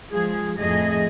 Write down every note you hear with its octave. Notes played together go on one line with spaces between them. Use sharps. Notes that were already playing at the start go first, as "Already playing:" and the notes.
F3 G#3 G#4
F2 A2 A3 G#4 D#5